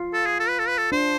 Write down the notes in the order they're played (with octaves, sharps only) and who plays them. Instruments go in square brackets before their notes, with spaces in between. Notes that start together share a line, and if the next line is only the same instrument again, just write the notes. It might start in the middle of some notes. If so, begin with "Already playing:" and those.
Already playing: [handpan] F4
[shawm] A4
G#4
A4
B4
A4
B4
A4
[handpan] D4 [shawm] C5